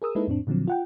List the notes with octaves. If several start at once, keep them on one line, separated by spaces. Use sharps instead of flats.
G#4 A#4 D#6 E6
G#3 A#3 D#4 E4 A4 B4
F2 A2 C4 D4
A#2 D3 F3 F#3 C4
F4 F#5 G5